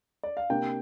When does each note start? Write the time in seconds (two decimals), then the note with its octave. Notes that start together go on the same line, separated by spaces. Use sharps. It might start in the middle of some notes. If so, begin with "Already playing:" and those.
0.23 D5
0.37 F5
0.50 C3 A#3 D4 G5